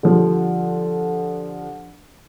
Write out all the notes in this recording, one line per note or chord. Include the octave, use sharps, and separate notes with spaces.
D3 F3 G3